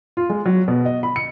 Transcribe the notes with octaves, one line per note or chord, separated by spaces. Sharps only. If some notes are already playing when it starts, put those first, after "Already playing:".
F4
G#3
F#3
B2
D#5
B5
C#7